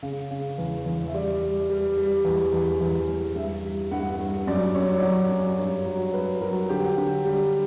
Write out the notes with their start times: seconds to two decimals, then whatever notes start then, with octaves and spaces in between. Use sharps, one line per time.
0.03 C#3
0.31 C#3
0.58 E2
0.86 E2
1.07 E5
1.14 G3 D5
1.42 G3
1.70 G3
1.97 G3
2.25 E2
2.53 E2
2.81 E2
3.08 E2
3.36 G2 E5
3.64 G3
3.91 G2 F#5
4.19 G2
4.47 F#2 D5
4.75 F#2 C#5
4.98 D5
5.02 F#3 C#5
5.30 F#2
5.59 G2 C#5
5.86 F#3
6.13 G2 B4
6.41 F#3 A#4
6.69 D3 G4
6.97 D3
7.25 G3